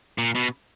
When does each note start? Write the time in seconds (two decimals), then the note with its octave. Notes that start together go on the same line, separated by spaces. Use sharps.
0.18 A#2
0.35 B2